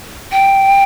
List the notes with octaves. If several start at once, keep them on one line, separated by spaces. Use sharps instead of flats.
G5